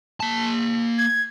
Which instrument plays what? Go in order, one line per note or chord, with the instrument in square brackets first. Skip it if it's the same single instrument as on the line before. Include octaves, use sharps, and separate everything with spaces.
[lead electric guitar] A#3 A5
[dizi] G#6